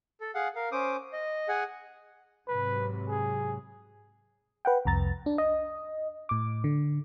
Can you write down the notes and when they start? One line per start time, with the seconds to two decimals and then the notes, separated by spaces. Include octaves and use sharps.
0.21 A4
0.35 G#4 F5 F#5
0.56 A#4 F5
0.72 C#4 C5 D6 D#6
1.13 D#5
1.49 G#4 F#5 G#5
2.48 G#2 C3 F#3 B4
3.09 G#4
4.65 B4 F#5 G5
4.85 C2 F2 A#5 A6
5.26 D4
5.38 D#5
6.29 A2 D6
6.64 D3